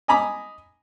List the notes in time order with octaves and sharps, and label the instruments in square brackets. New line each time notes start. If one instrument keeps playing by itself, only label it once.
[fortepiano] D#5 G#5 A#5 B5 D6 D#6